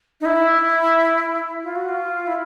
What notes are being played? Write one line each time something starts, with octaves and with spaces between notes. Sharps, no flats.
D#4
E4
F4
F#4
F4
E4